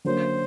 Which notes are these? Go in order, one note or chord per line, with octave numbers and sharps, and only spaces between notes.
D3 F#3 A#3 C#4 C5